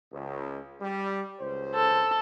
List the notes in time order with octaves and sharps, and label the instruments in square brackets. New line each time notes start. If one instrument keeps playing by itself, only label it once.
[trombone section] C#2
G3
C#2 C5
[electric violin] A4